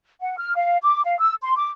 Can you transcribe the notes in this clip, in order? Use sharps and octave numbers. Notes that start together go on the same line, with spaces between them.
F#5
F6
F5
D6
F5
E6
C6
D6